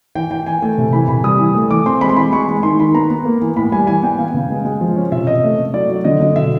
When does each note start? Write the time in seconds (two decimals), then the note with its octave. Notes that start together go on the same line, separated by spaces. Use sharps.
0.15 E3 G5
0.30 E3 G5
0.46 E3 G#5
0.62 A3 G#5
0.78 C3
0.93 E3 B5
1.08 C3 B5
1.24 G3 D#6
1.39 E3
1.55 A3
1.71 E3 D6
1.86 C4 C6
2.01 G#3 B5
2.09 C6
2.17 E3 B5
2.32 G#3 C#6
2.49 G#3
2.63 D#3 C6
2.79 D#3 B5
2.94 B3 A#5
3.10 B3
3.25 A#3
3.42 E3
3.56 A2 B5
3.72 G3 G#5
3.87 E3 G#5
4.03 B3 G5
4.19 B3 F5
4.34 C#3
4.50 G#3
4.65 G#3
4.81 F3
4.96 C#4
5.12 C3 E5
5.27 C3 D#5
5.43 A3
5.59 A3
5.74 F#3 D5
5.89 F#3
6.04 D3 D#5
6.20 D3 D#5
6.36 B2 E5